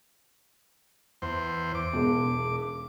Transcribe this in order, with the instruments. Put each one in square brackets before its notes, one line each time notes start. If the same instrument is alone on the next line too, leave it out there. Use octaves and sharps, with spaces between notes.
[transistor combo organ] E2 C5
D6
[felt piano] E1 B1